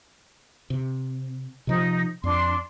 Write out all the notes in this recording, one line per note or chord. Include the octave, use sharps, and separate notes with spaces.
C3
C3 E3 F3 D#4
F2 D4 C6